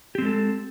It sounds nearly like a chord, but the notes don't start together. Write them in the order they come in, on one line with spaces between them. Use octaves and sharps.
G4 C4 G#3 A4